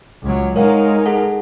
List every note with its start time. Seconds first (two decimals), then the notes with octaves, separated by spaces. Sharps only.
0.22 C#2 F#3
0.56 G#3 D#4 A#4 C#5 F5 F#5
1.06 G#4 A4 F#5